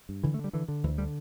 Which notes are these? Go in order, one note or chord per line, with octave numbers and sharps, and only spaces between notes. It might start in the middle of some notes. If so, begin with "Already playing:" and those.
G2
D3 E3
A3
D3
G3
D3 E3
D3
D2 E3
D3 G3